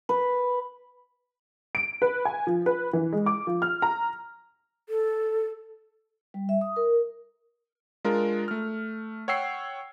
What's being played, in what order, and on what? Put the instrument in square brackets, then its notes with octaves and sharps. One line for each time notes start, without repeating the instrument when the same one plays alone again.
[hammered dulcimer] B4
[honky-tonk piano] D7
B4
G#5
F3
B4
E3
G#3
D6
F3
F6
A#5
[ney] A4
[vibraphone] G3
E5
D#6
A#4
[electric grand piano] G#3 D4 F4 A#4
A3 F6
C#5 F#5 G5 E6 C7